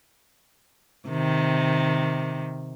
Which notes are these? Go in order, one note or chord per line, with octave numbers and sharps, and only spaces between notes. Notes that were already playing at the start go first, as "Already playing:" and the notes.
C3 D#3